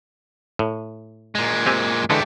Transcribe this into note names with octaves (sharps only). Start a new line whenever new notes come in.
A2
A#2 G#3
C4 G4 G#5
D3 E3 G#3 A3 G4